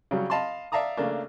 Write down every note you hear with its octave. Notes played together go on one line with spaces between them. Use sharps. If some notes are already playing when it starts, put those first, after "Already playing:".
C#3 F#3 G3
D#5 F5 A5 B5 C6
D5 E5 F5 A5 A#5 D#6
C#3 A3 A#3 D4